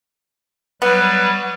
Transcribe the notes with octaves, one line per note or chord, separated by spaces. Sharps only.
F#3 G3 B3 B4